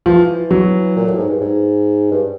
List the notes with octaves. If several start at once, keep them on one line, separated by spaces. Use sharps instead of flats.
E3 F3
F#3
A#2
A2
G#2
G2
G#2
G2